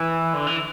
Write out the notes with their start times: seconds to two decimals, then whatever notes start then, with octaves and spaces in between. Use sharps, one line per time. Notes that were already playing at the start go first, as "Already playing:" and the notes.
Already playing: E3
0.34 D3
0.47 E3